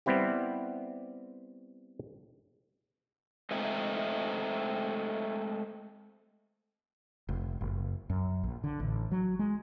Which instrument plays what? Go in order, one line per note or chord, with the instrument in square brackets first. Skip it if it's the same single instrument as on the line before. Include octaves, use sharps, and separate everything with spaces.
[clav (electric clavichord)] G3 B3 C4 E4 G4
[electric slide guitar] G#3 A3 C4 D#4 E5
[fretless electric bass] F1
F#1
F#2
A#1
D3
A1
F#3
G#3